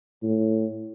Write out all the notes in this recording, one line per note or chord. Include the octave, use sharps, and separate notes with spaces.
A2